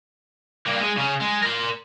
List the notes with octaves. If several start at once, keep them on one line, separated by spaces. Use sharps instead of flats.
G2 A#3
G#3
C#3 C#4
G#3
A#4 C6